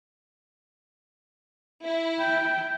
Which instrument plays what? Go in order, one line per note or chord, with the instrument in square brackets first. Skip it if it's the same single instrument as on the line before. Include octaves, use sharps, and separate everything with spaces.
[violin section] E4
[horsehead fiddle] G5